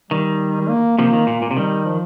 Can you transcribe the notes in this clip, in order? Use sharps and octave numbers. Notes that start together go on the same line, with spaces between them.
D#3 G3
G3
A#3
C3 F3 A#3
D#3
A#2
A#2
C3
D#3 G3
F3